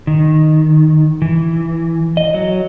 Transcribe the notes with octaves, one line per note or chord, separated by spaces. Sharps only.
D#3
E3
D#5
F#3